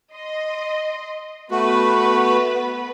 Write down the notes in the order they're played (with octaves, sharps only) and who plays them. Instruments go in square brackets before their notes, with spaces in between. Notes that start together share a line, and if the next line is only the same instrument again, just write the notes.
[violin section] D#5 C6
[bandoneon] A3 F#4 [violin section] B3 B4